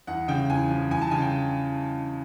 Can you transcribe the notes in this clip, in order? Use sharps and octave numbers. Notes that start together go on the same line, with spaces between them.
E2 F#5
C#3 G5
E2 G#5
F3
E2 G#5
A5
C#3 G#5
G5